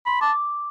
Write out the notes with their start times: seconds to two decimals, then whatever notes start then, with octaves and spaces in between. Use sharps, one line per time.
0.06 B5 C6
0.21 A5 D6